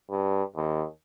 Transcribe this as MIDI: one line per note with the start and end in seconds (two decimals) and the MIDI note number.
0.10 0.43 43
0.56 0.86 39